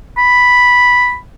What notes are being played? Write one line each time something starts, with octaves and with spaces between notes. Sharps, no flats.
B5